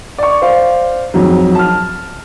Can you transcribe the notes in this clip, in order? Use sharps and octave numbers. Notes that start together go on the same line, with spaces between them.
D5 C#6
C5 D5 F5
F2 G#2 F#3
A5 F6